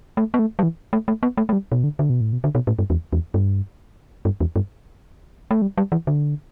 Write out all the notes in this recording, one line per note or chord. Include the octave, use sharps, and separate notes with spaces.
A3
B3
A3
G3
E3
A3
A3
B3
A3
A3
G3
B2
D3
D3
B2
A2
B2
D3
B2
A2
G2
E2
E2
G2
G2
E2
G2
A3
G3
G3
E3
D3